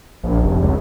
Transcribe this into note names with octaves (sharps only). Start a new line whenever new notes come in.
A#1
F1
C#2